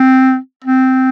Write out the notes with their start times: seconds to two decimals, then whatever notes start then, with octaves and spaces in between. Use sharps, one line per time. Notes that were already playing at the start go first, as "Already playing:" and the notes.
Already playing: C4
0.64 C4